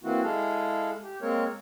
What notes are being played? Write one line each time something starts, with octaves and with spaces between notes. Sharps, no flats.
E3 A#3 C4 E4 F#4
G#3 E4 G#4 A4 F5
G4
G#3 A#3 C4 A#4 C#5